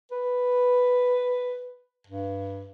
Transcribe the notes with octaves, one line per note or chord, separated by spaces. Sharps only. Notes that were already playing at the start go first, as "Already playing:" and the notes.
B4
G2